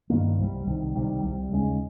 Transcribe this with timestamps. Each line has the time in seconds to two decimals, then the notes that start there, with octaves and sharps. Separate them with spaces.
0.10 G2 D#3 A#3
0.38 C2 C3 D#3 G3
0.66 C2 C3 D#3 G3
0.95 C2 C3 D#3 G3
1.24 C2 C3 D#3 G3
1.52 D#2 C#3 G#3 C#4